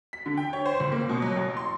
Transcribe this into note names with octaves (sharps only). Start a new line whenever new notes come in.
B6
D3
G5
C#5
C5
C#2
A#3
B2
F#3
A1
C6